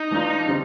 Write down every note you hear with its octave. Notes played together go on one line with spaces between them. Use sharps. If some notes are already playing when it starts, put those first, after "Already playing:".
Already playing: D#4
E3 A3 D4 F4
D3 G3 C4